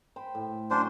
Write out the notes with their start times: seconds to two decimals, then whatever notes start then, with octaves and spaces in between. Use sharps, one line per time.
0.16 C5 G5 B5
0.35 A2
0.71 F#3 C#4 D4 C5 C6